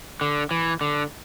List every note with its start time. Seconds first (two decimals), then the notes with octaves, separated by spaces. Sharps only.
0.21 D3
0.51 E3
0.81 D3